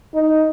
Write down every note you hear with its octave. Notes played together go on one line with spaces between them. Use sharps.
D#4